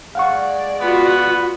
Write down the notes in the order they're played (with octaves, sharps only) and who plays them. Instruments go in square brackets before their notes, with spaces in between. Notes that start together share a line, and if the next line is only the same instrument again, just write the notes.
[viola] G#3 D5 [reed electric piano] F5 F#5 C#6
[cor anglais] B3 [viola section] F4 F#4